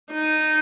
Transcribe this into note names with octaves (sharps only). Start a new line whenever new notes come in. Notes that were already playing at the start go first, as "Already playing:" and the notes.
D#4